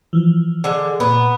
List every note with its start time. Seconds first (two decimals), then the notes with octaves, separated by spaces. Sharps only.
0.13 E3 F3
0.64 D3 G#3
1.00 A#2 B3